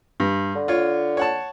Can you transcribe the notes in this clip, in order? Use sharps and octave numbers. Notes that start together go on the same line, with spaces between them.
G2
D3
F4 C#5
C#5 F#5 A5